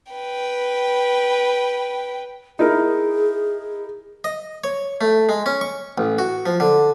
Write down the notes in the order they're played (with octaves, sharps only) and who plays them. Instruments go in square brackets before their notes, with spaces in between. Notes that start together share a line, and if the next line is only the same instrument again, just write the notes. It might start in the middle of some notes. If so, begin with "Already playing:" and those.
[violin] B4 G5
[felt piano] D#4 E4 A#4 [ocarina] G#4
[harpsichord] D#5
C#5
A3
G#3
C#4
C#6
A1
F#4
F3
D3